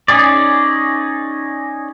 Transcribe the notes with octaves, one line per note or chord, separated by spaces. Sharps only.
C#4 D#4 G#4 D5